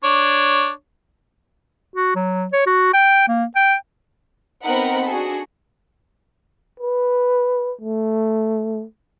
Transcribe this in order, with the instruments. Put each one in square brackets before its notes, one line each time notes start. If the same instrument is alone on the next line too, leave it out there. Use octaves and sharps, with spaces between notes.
[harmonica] D4 C#5
[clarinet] F#4
F#3
C#5
F#4
G5
A#3
G5
[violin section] B3 C4 D#4 A#4 F#5 B5
D4 F#4 G#4 A4
[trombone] B4
A3